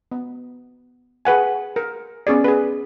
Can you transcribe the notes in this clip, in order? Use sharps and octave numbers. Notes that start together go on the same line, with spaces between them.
B3
G#4 B4 F#5 G#5
A#4
B3 C#4 G#4 D5
G#4 B4